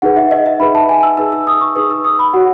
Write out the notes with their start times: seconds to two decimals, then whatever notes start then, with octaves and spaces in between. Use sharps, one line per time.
0.02 D#4 G#4 B4 F#5
0.17 E5
0.31 D#5
0.46 E5
0.60 D#4 G#4 B4 B5
0.75 A5
0.89 G#5
1.03 E6
1.17 D#4 G#4 B4 E6
1.32 E6
1.47 D#6
1.61 C#6
1.75 D#4 G#4 B4 D#6
1.90 E6
2.04 D#6
2.19 B5
2.33 F#4 C#5 F#5